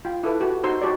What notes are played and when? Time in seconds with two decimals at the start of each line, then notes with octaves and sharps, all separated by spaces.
0.05 F4 G5
0.23 E4 A4 B4
0.40 F#4 G4 B4
0.63 D#4 F#4 C5 A#5 C6 E6
0.82 D#4 F#4 G4 C#5 D5